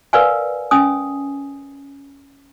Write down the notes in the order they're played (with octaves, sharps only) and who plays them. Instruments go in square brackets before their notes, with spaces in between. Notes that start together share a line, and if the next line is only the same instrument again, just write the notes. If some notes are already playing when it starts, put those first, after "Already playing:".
[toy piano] A#4 B4 D5 F5 F#5 G#5
C#4 G#5 D#6